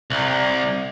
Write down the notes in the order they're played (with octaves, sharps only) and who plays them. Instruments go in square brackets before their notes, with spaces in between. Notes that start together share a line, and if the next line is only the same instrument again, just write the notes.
[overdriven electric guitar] C2